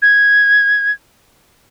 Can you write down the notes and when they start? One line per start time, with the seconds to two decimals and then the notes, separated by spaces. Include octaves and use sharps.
0.02 G#6